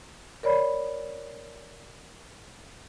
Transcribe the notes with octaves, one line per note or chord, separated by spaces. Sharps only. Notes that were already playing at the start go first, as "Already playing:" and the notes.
A#4 C#5 D5 B5